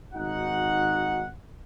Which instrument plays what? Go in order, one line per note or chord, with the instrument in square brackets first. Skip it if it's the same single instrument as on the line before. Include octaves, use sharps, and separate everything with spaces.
[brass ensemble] G#1 D#4 F#4 F#5